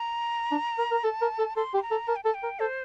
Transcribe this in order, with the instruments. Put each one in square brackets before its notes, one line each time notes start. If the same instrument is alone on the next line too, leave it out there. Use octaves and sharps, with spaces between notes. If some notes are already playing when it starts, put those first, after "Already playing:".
Already playing: [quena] A#5
[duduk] D4
A#4
A#4
[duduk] A4 [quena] A5
[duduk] A#4
A4
[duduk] A4 [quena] C6
[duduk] G4
[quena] C6
A#5
[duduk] A4
[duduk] A#4 [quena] A5
[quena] G5
[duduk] A4 [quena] A5
[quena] G5
[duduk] A#4
[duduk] A4 [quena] C5